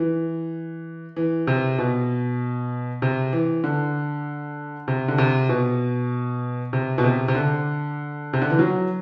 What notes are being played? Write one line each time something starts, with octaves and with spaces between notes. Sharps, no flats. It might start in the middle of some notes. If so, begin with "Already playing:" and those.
Already playing: E3
E3
C3
B2
C3
E3
D3
C3
D3
C3
B2
C3
B2
C3
C3
D3
C3
D3
E3
F#3